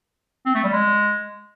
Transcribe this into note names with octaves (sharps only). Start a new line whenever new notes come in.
C4
A3
G3
G#3